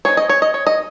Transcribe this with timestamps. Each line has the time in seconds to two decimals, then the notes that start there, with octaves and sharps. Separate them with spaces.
0.05 G#3 C4 D#4 C#5
0.17 D#5
0.29 C#5
0.42 D#5
0.54 C#5
0.67 D#5